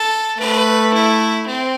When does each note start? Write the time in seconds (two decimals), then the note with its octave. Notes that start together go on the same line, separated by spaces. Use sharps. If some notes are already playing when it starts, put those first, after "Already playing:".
Already playing: A4
0.39 A3 B4
0.93 E4
1.47 C4